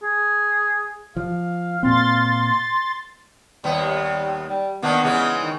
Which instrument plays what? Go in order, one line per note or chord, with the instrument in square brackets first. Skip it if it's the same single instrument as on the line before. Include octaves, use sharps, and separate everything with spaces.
[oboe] G#4
[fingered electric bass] F3 [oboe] F5
[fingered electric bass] A#2 C4 [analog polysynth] C6 A6
[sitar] D#2 B3 [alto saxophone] G3
[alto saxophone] G3
[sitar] D#3 A#3 D4 [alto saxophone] B3
[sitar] C#3 E3 G#3
[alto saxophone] D#3